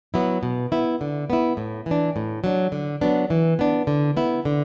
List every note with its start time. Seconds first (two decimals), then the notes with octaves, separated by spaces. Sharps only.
0.14 F#3 B3 E4
0.43 B2
0.72 B3 E4
1.01 D3
1.30 B3 E4
1.57 A2
1.86 E3 D4
2.16 A2
2.44 F#3 D4
2.72 D3
3.01 F#3 B3 D4
3.30 E3
3.59 B3 D4
3.87 D3
4.17 B3 E4
4.45 D3